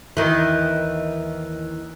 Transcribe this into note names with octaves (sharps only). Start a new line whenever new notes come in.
D#2 D#3 E3